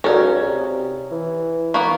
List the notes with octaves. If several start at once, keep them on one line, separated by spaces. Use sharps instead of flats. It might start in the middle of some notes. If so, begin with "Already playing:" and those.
C#2 C#4 D#4 F#4 A4 A#4 D5 F5
C3
E3
A#3 B3 B5 C#6